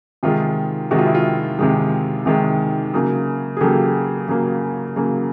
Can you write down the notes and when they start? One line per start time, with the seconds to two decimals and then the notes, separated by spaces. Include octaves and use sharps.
0.23 C3 D#3 G#3 F4
0.91 C3 D#3 G#3 F#4
0.98 F4
1.06 E4
1.15 F4
1.59 C3 D#3 G#3
2.26 C3 D#3 G#3
2.94 C#3 F#3 A#3
3.57 G#4
3.61 C#3 F#3 A#3 G4 A4
4.28 C#3 F#3 A#3
4.96 C#3 F#3 A#3